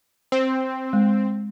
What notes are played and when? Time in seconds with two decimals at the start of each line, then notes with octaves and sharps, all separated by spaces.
0.32 C4
0.93 G#3